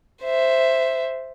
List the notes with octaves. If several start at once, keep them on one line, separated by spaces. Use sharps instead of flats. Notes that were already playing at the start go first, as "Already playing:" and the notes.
C5 E5